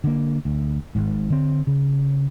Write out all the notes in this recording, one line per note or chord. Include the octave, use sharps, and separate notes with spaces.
D3 A#3
D2
G#1 G#2
D3 C4
C#3